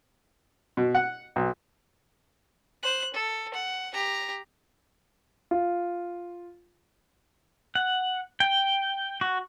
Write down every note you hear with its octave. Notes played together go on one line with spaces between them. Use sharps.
B2
F#5
B1
C5 F#6
A4
F#5
G4 A#5
F4
F#5
G5
F#4